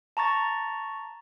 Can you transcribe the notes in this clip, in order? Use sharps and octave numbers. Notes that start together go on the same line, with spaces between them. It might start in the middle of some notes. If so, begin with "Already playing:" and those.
A5 A#5 C#6 A6